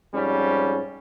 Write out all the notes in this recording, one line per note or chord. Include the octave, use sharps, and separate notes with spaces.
F2 G#2 G3 C#4